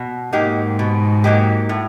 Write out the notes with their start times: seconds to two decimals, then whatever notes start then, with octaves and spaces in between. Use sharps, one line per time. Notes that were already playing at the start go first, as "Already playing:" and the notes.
Already playing: B2
0.33 G#2 F#3 A#3 D#4 G4
0.79 B2
1.24 F#3 A#3 D#4 G4
1.69 A2